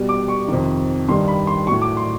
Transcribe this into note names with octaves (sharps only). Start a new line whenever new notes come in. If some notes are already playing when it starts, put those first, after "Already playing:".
Already playing: B2 G3
D6
C#6
F2 C3 D#3
G2 D#3 G3 C6
B5
C6
A2 F#3 C#6
D6
C6